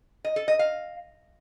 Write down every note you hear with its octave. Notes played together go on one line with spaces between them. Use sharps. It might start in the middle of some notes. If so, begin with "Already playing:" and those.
D#5
A4
D#5
F5